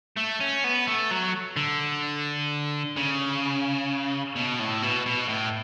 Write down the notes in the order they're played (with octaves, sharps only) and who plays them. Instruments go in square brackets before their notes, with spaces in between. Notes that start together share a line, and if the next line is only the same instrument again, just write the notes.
[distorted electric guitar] A3
C#4
B3
A3
F#3
D3
C#3
B2
A2
B2
B2
A2